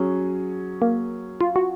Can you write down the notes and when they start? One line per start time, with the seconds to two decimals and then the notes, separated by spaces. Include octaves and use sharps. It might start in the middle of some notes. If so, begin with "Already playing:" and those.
Already playing: F#3 C#4 G#4
0.82 A#3
1.41 F4
1.56 F#4